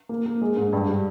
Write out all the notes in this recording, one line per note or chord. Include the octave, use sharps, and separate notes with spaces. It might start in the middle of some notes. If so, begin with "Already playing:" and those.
A#3
A#3
G#3
G#2
G2
G3